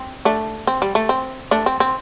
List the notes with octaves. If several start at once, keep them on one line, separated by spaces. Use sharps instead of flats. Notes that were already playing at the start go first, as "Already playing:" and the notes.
Already playing: C4
A3 D4
C4
G3
A3
C4
A3 D4
C4
C4